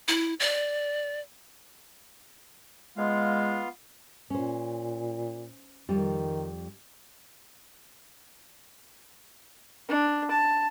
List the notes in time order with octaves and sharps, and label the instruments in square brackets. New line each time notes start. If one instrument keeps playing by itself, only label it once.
[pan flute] E4
D5
[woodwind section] G#3 [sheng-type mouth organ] B3 F4 F5
[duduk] A#2 [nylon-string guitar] C#4 C5
[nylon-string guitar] F2 G3 [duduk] D#3
[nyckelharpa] D4
A5